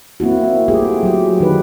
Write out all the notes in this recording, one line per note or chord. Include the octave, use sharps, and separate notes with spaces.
A#3 C4 E4 F#4
C4
A3 F4 G4 G#4
F#3 G4
D#3 D#4 B4